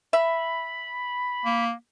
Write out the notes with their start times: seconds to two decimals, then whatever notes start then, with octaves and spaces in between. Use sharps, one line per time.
0.13 E5 B5
1.45 A#3